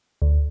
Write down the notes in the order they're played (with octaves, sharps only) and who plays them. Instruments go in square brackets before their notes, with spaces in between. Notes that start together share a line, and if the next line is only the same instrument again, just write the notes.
[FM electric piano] D2